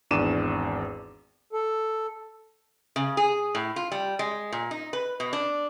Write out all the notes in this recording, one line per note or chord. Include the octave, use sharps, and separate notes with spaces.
G#1 E2 D4 D6 D#7 E7
A4
C#3
G#4
A2
F4
G3
G#3
A#2
D#4
B4
B2
D4